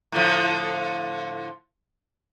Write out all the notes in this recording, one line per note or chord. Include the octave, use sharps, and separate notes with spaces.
A2 D3 F3